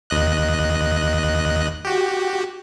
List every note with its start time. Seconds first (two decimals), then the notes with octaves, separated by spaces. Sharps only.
0.10 D#2 D#5 F#6
1.85 F#4 G4